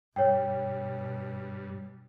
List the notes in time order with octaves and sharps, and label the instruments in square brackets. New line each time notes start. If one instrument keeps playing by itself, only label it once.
[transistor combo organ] G2 [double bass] B2 [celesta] C#5 G5